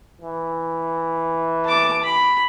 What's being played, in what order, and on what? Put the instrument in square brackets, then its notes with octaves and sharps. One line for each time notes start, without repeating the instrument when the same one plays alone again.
[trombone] E3
[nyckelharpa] A5 D6
B5